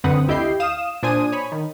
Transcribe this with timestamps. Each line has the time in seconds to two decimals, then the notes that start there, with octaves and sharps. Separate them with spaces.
0.04 F#2 D3 C4 B4 F#5 D#6
0.28 D2 E4 G4 D#5 G6 C7
0.60 F5 D#6 E7
1.03 A#2 D4 C5 G#5 D#6 D#7
1.32 C#5 B5
1.52 D#3